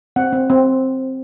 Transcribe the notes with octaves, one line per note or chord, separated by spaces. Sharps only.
C4 F#5
C4
C4